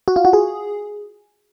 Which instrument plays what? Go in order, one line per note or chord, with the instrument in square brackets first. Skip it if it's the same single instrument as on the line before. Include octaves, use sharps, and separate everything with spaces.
[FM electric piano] F#4
F4
F#4
G#4